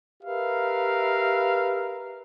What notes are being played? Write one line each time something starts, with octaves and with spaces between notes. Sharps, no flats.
G4 A#4 B4 E5 F5